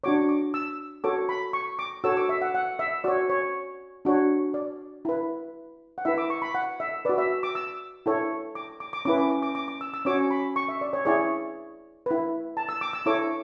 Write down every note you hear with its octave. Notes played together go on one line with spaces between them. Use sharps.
D4 F#4 C#5 D6
D6
E6
F#4 A4 C#5 D6
B5
C#6
D6
F#4 A4 C#5 E6
D6
E5
F#5
F#5
E5
F#4 C#5 D5
C#5
D4 F#4 C#5
D5
E4 B4
F#5
E4 B4 E5
D6
C#6
B5
F#5
E5
F#4 B4 D5
E5
D6
E6
E4 A4 C#5
D6
D6
D6
C#4 E4 B4 D6
D6
D6
D6
D6
D6
E6
E6
C#4 F#4 C#5 D6
B5
C#6
E5
D5
C#5
E4 G#4 C#5 D5
E4 B4
A5
E6
D6
E6
E4 A4 C#5 D6